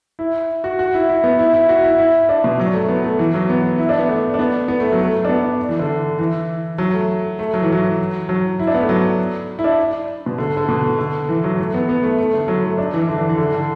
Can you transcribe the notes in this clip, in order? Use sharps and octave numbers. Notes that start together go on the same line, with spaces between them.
E4
F#4
F#4
E4
E4
B3
E4
E4
F#4
E4
E4
D4
B2
F#3
A3
B3
A3
E3
F#3
B3
E4
D4
B3
A3
D4
B3
B3
A3
F#3
A3
D4
B3
E3
D3
E3
F#3
A3
A3
F#3
E3
F#3
F#3
E4
D4
B3
A3
F#3
E4
D4
B2
D3
D3
B2
D3
E3
F#3
A3
B3
B3
A3
A3
D3
F#3
A3
D4
E3
D3
E3
E3
D3
D3